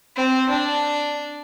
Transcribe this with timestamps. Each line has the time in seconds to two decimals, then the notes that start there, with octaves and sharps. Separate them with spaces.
0.16 C4
0.49 D4